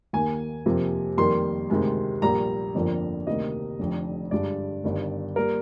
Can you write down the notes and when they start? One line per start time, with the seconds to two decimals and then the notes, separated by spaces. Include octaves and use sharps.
0.13 D#2 D#3 A#3 G#5
0.66 F2 C3 F3 A#3
1.18 F2 D#3 G3 A#3 C6
1.70 D2 C3 D#3 G#3
2.22 A#1 A#2 G3 A#3 A#5
2.75 G1 F2 D3 F3 A#3
3.27 D2 C3 D#3 A#3 D#5
3.79 F1 F2 D3
4.31 G2 D3 G#3 D5
4.84 G1 G2 D#3
5.36 G3 A#3 A#4